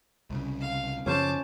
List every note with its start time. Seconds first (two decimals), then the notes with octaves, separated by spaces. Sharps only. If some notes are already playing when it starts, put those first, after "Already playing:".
0.30 C2 C#3
0.61 F5
1.06 F#2 C#3 F3 C#4 C5 A5 D6